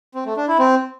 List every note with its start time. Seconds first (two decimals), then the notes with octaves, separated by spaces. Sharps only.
0.15 C4
0.26 A3
0.37 D4
0.48 E4
0.59 C4